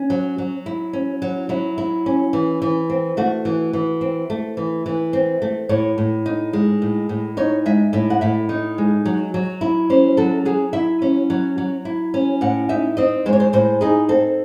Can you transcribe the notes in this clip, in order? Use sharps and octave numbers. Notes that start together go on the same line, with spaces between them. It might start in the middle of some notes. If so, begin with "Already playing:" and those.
Already playing: C#4
F#3
F#3
E4
C#4
F#3
F#3 E4
E4
C#4
E3
E3
C4
A3 F#4
E3
E3
C4
A3
E3
E3
C4
A3
A2 C#5
A2
D#4
G#3
A2
A2
D#4 C#5
G#3 E5
A2 E5
F#5
A2 E5
D#4
G#3
F#3
F#3
E4
C#4 C5
F#3 A4
F#3 G#4
E4 E5
C#4
F#3
F#3
E4
C#4
A2 F#5
D#4 E5
C4 D#5
G#3 C5
C#5
C5
A2 C5
D#4 G#4
C4 A4